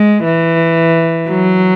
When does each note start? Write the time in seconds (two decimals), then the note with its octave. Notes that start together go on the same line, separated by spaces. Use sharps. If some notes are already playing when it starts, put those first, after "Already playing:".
Already playing: G#3
0.24 E3
1.29 F#3